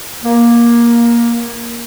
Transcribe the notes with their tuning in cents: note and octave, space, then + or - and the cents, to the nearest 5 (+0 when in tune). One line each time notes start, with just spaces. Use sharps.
A#3 +15